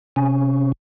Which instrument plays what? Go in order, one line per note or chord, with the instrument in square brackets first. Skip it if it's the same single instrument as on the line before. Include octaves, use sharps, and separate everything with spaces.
[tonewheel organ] C3 C#4